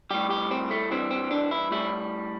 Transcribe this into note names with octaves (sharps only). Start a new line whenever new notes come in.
A2 G3 G4
G4
C4
A3
G2 E3 G3 C4
C4
D4
E4
A2 G3 E4